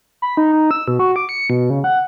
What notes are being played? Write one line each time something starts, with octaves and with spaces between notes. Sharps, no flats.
B5
D#4
D#4
E6
B2
F#4
D6
C#7
B2
C#3
F#5